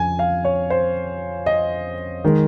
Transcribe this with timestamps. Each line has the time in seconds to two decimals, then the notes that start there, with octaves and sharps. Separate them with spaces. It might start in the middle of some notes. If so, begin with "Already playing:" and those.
Already playing: F2 C#3 G#5
0.19 F5
0.45 C#5
0.70 C5
1.46 D#5
2.25 D#3 G#3